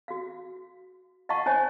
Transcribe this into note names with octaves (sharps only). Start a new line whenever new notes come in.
F#4 F5
D#5 F5 F#5 A5 C#6
D#4 C5 C#5 D#5 G#5 A5